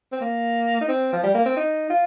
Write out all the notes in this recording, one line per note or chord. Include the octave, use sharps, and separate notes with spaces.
C4
A#3
D#4
C4
F3
G3
A#3
C4
D#4
F4